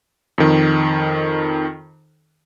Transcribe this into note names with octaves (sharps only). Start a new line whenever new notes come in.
F2 D#3